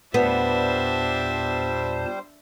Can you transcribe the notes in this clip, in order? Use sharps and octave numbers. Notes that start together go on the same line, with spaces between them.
E2 A#2 G3 B3 D4 C5 E5 A5